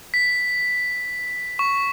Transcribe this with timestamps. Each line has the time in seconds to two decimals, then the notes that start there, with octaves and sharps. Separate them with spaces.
0.14 B6
1.59 C#6